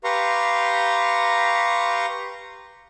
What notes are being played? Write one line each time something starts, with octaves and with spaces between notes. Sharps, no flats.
G4 B4 F5 A#5 C6 C#6